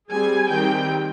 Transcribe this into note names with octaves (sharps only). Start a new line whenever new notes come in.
G3 C4 G#4 G#5
D#3 G3 C4 G4 G5